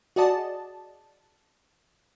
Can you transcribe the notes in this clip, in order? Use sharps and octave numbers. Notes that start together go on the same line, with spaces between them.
F#4 G#4 D5 D#5 A5